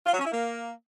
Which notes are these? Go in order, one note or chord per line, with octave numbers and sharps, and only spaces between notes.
F4
F#3
C#4
E4
A#3